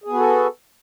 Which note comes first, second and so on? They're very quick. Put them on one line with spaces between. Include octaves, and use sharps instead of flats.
G#4 B3 F#4 A4